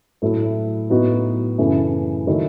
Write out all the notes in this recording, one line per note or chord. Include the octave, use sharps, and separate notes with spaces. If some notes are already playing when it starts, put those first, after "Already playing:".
A2 F#3 A3 E4
A2 F#3 B3 D#4 F#4
F#2 C#3 E3 A3 E4
D#3 F#3 A3 E4